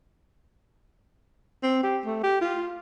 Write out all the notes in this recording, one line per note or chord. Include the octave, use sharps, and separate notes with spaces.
C4
G4
A3
G4
F4